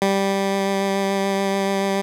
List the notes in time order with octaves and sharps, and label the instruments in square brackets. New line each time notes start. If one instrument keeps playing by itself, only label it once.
[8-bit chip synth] G3